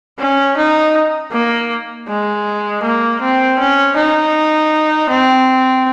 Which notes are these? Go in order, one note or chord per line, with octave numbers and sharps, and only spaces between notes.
C#4
D#4
A#3
G#3
A#3
C4
C#4
D#4
C4